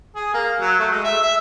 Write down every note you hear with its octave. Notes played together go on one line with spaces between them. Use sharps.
G#4
A#3
F#3
A3
G#3
E5
E5